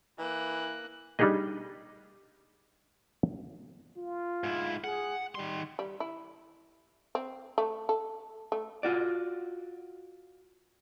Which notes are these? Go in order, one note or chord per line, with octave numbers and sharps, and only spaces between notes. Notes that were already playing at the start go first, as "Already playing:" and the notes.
E3 A#3 F#6
G3 D4 D#4 G4 G#4 D#5
F4
G#2 E4
G#4 F#5
D#3 G3 C6
G3
E4
C4
A3
A4
A3
F4 F#4 D5